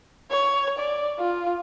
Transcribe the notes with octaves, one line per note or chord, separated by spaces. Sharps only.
C#5
D5
F4